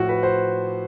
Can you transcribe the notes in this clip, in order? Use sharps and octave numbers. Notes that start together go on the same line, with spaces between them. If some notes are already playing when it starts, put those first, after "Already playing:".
Already playing: A2 F3 F#4
B4
C5